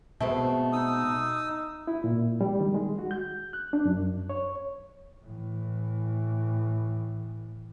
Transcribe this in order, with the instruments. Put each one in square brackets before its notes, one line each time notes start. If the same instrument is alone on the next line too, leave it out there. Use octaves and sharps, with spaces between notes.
[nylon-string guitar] B2 G#3 [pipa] A3 B3 C4
[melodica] D#4 D#6 E6
[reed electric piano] E4
A#2
G3
D#3
G#3
F#4
G6
F#6
D4
F#2
C#5
[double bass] A2 E3